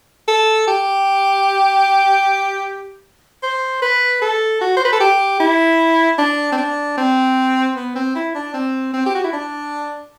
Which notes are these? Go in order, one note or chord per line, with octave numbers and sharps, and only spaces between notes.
A4
G4
C5
B4
A4
F#4
C5
B4
A4
G4
E4
D4
C4
D4
C4
B3
C4
E4
D4
C4
C4
G4
F#4
E4
D4